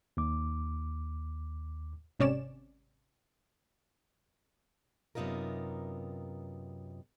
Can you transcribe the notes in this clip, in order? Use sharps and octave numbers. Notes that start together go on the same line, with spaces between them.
D#2 D6
G#1 C3 C#4 C#5 D5 E7
F#2 C3 B3 D#4 F4 A#4